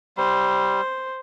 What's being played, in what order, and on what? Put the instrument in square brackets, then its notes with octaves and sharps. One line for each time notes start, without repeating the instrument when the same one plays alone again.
[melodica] G3 [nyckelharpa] C5